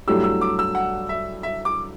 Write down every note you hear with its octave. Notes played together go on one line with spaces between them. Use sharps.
G2 F#3 A3 E4 G4 E6
E6
D6
E6
F#5
E5
E5
D6